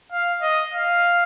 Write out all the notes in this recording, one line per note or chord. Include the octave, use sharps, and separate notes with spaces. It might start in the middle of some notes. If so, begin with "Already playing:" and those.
F5
D#5
F5